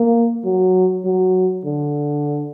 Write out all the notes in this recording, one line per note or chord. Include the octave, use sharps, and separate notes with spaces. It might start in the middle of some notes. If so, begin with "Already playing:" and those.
Already playing: A#3
F#3
F#3
D3